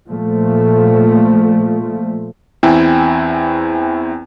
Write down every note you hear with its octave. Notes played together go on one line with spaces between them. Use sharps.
A#2 F3 A3
E2 C4 E4 G5 G#5